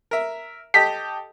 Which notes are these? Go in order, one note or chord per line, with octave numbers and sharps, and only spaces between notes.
A#4 E5
G4 A4 D#5 B6